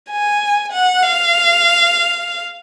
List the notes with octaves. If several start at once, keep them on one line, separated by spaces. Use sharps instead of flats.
G#5
F#5
F5